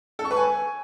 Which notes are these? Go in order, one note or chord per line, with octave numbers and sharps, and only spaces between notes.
A4
C#6
B4
G#5